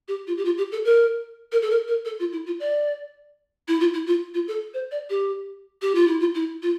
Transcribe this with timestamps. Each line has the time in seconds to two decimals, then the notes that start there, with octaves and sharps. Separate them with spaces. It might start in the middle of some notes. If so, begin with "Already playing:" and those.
0.08 G4
0.27 F4
0.37 G4
0.45 F4
0.58 G4
0.72 A4
0.85 A#4
1.52 A#4
1.62 A4
1.70 A#4
1.88 A#4
2.05 A4
2.20 F4
2.33 E4
2.46 F4
2.60 D5
3.68 E4
3.80 F4
3.94 E4
4.07 F4
4.34 F4
4.48 A4
4.74 C5
4.91 D5
5.10 G4
5.82 G4
5.95 F4
6.07 E4
6.20 F4
6.35 E4
6.62 F4